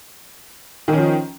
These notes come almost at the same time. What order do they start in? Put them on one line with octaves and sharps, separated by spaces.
D#3 C#4 F3